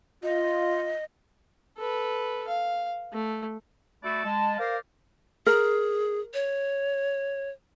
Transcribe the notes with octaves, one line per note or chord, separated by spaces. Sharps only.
F4 D#5
A4 B4
F5
A3
A3 F#4 A4 D5 B5
G#3 A5
A#4 C5 D5 F5
G#4 A#4
C#5